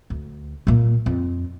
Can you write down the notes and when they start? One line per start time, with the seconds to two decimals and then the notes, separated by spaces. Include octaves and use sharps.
0.10 D2
0.67 A#2 A#3
1.06 F2